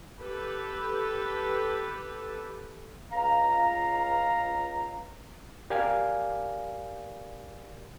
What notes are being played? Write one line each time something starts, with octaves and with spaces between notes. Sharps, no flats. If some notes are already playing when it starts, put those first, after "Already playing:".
G4 A4 B4
C#2 F5 A#5
G4 A#4 D5 F5 G5 G#5